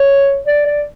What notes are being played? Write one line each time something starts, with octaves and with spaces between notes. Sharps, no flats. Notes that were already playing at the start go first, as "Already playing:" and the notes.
Already playing: C#5
D5
D5